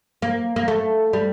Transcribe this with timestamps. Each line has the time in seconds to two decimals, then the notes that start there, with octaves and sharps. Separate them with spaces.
0.22 A#3
0.56 A#3
0.68 A3
1.13 G3